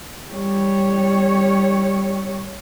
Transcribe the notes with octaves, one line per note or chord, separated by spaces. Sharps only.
G3 C#5